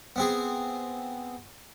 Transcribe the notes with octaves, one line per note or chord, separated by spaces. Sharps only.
B3 C4 G#4